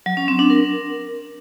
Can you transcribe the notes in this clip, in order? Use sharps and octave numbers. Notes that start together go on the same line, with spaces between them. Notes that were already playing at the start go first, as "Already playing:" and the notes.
F#3
C#4
C4
D4
A#4